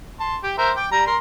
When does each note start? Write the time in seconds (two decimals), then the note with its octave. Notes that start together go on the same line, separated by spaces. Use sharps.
0.20 A5 C6
0.43 G4 G5
0.58 A#4 C5 E5
0.76 G5 D6
0.92 G3 A#5
1.07 A#4 C6